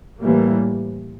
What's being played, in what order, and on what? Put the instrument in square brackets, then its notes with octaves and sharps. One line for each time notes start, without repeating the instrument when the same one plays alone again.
[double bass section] A2 E3 G3 A#3